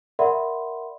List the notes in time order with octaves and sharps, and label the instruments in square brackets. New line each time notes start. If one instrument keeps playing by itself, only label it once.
[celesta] A#4 D5 E5 F#5 B5 C6